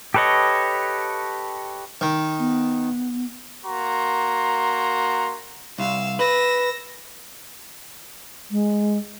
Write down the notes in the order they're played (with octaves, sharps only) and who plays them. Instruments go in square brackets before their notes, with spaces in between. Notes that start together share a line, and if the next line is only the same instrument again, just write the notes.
[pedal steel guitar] G4 A4 B4 C#5 D#5
[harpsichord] D#3
[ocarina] B3
[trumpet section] A#3 F#4 A#5 C6
[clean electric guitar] C2 [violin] F5 E6
[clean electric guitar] B4 [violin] E6 A#6
[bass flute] G#3